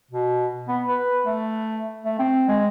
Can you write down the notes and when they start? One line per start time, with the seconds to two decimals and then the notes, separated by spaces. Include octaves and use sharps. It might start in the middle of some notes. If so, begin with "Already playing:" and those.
0.11 B2
0.68 B3
0.88 B4
1.26 A3
2.05 A3
2.19 C4
2.48 G#3